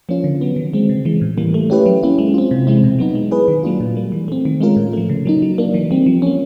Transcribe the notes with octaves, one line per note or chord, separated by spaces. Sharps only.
F3 A#3 C#4 F4
D3
F#3 B3
D#3
G#3 C4
C#3
E3 G#3
A2
E3 G3 A#3
A3
C#4 E4 G4 B4
F#3
A#3 C#4 E4
G#3
C4 F4
C3
E3 G#3 C4 E4
B2
F#3 B3 D#4
G#3
B3 E4 G#4 B4
D#3
F#3 A#3 D4 F4
A#2
G3 A#3
E3
A3 C4
D#3
G#3 C#4 F4 A#4
A2
F3 A3
C#3
F#3 A#3 D#4
F#3
A#3 D4
E3
G3 C4
F3
A#3 C#4